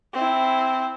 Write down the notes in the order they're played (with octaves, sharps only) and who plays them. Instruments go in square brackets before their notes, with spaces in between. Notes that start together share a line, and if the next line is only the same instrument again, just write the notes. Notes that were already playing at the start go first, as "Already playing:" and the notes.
[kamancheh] C4 E4